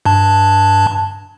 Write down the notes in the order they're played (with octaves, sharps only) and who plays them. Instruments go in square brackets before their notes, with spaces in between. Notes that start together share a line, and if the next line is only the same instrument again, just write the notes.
[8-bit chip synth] G2 A5